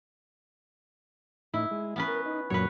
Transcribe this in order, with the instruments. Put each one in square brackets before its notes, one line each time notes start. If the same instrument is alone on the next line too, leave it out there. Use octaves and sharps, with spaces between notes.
[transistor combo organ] A2 D#4 [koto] E4
[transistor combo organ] G#3
[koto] B3 C#4 B4
[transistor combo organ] A#4
D#4
[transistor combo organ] F#2 A#2 F#3 [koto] B4 C#5